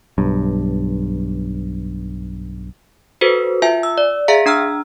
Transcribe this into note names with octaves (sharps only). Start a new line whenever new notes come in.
B1 G2
F#4 A4 B4 C5
F4 E5 G#5
E6
D5
G#4 E5 F5 A#5 B6
D4 A#5 E6 F6